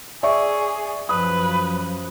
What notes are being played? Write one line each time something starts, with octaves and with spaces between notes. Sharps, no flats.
G#4 D5 E5 C#6
F#2 F3 B4 D#6